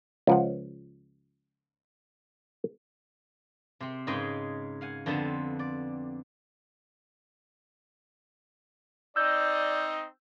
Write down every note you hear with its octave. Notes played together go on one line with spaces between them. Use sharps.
C#2 F3 F#5
C3 C4
G#2 C#3 G#3 B4 D#5 G5
F5 F#5 G#5
F2 D3 B3 C4 A5
D5
C4 D#4 D5 D#5 E6 G6